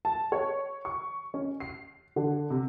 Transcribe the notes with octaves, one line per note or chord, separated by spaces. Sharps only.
A5
C#5
C#6
C#4
C7
D3
C3